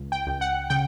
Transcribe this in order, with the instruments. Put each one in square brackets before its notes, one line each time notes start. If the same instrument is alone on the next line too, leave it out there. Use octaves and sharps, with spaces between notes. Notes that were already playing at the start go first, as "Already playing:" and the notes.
Already playing: [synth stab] C#2
G5
C#2
F#5
C#3 G5